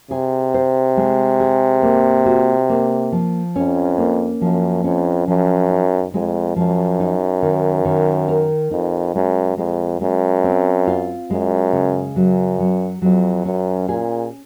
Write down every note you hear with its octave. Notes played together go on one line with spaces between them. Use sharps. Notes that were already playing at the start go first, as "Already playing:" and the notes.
C3 G#4
C5
G#3
G#4
A#3
F#4
A#3
F3
F2 C#4
A#3
F#2 F3
F2 C#4
F#2 F3
D#4
F2 G#3
F#2 F3
D#4
D#3
D#3
A#4
F2 D#4
F#2 G#3
F2 G#3
F#2 G#3
C4
F4
F#2 G#3
C#3
F#2 F#3
F#3
F2 F#3
F#2 C#4
A#2 G#4